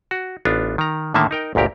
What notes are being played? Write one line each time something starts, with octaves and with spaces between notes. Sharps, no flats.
F#4
A1 B3 D4 F4
D#3 A#5
A2 D3 D#3 A#3 E5 A5
D#4 A#4 G5
G1 D2 A#2 G4 A#4